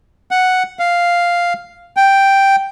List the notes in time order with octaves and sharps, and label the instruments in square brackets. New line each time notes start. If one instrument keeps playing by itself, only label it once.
[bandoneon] F#5
F5
G5